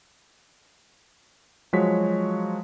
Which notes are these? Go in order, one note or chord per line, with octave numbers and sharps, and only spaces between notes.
F3 F#3 G#3 F#4 C#5 B6